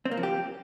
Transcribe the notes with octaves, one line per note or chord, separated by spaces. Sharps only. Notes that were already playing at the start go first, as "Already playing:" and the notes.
C4
A#3
F3
G4